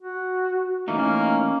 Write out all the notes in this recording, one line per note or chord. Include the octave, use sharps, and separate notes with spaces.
F#4
E3 A3 A#3 C#4 D#4